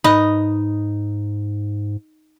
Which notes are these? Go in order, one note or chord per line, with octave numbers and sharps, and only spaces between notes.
G#2 D#4 B4 D#5